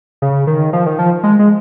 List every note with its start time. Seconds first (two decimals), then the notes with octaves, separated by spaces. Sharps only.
0.22 C#3
0.47 D#3
0.73 F3
0.86 D#3
0.99 F3
1.23 G#3
1.39 G#3